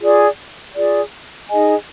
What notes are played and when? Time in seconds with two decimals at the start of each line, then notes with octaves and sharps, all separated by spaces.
0.01 F4 G#4 D5
0.75 F4 G#4 D5
1.49 D#4 G#4 D#5 G#5